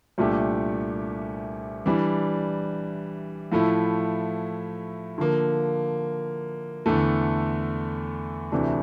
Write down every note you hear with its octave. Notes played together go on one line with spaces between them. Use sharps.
C2 A#2 A3 D4 G4
E3 G3 D4
A2 F3 A3 E4
D3 F3 A#3
E2 D3 A3
D2 C3 E3 A3 D4